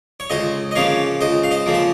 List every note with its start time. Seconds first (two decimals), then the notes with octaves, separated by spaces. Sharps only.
0.20 C#5
0.30 C#2 C5 D#5
0.71 D#5
0.75 C#3 F3 A#3 C#5 F5
1.21 C#2 C5 D#5
1.43 F5
1.51 C5 D#5
1.66 C#3 F3 A#3
1.74 C5